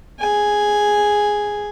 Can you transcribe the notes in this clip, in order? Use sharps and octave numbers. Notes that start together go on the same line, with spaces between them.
G#4 G#5